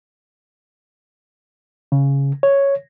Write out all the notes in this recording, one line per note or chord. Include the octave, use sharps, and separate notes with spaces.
C#3
C#5